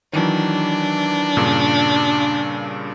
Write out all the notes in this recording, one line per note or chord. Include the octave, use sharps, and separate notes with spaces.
D#3 E3 F#3 D4
G2 A#2 C#3